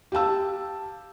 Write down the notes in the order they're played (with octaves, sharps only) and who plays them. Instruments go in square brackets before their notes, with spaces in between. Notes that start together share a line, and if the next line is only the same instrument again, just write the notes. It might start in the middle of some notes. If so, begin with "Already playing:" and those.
[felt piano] G4 F5 A5 E6